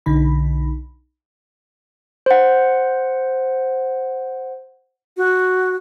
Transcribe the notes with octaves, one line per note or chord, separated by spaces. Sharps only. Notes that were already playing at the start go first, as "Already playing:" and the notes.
B1 D3 D#4 B5
C5 F#5
F#4